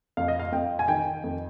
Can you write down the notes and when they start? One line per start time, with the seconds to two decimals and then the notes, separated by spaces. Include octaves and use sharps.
0.17 F2 F5
0.28 D#5
0.39 F5
0.52 F2 G5
0.79 G#5
0.88 D#3 G5
1.24 F2